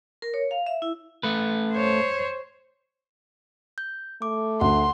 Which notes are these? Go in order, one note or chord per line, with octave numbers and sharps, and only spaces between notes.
A#4
C#5
F5
E5
E4
A3 B4
C5 C#5
G6
A3 D6
D2 F#5 C6